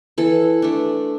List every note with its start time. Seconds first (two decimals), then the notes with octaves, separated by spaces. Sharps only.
0.18 E3 A4
0.62 A3 D4